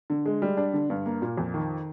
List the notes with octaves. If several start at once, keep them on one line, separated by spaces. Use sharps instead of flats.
D3
G#3
G3
D4
D3
G2
A#3
A#2
F2
D#3